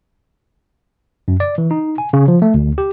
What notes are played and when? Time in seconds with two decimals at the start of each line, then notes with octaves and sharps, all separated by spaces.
1.28 F#2
1.40 D5
1.58 E3
1.71 D#4
1.98 G#5
2.13 C#3
2.28 F3
2.42 A3
2.54 D2
2.78 G4